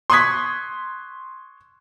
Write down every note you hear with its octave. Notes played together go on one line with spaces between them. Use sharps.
C6 C#6 D#6 F#6 G#6 B6